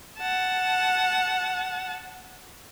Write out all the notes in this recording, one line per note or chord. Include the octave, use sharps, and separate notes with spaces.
F#5 A5